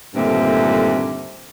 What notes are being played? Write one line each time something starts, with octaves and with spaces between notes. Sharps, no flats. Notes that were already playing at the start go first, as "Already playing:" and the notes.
G2 A#2 D3 D#3 A3 C4